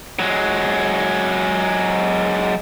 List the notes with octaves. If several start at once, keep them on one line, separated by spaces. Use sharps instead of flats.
F#3 G#3